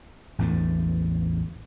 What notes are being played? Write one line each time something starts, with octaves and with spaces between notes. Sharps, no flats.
A1 E2 A2 D3